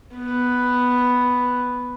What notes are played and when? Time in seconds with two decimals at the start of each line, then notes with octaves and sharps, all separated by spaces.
0.14 B3 B4